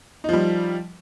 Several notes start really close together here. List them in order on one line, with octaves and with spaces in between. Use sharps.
D#4 F3 G3